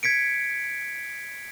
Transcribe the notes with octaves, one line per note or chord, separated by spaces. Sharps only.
G#6 B6 C#7 D7